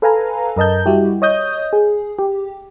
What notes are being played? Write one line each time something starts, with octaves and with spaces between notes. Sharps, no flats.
A4 B4 F5 G#5 A#5
F#2 A#4 D#5 A5 G6
G3 E4 F#4 G4
C#5 D#5 D#6 G6
G#4
G4